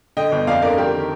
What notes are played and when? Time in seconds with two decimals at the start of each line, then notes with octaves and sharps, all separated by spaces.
0.17 D3 D#5 G5
0.32 G1
0.47 F2 D5 F5
0.62 D3 A#4 D5
0.78 F2 G4 A#4
0.93 D#3